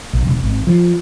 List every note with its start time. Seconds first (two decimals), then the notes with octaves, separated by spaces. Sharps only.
0.13 A#1
0.25 E1
0.43 G#1
0.67 F3